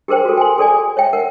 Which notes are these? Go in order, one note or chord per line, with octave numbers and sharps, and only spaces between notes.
G4 G#4 A#4 C5 G5
F#4 A4
G5 G#5 C6
G#4 A4 D5 G#5
C#5 E5 G5
A#4 F#5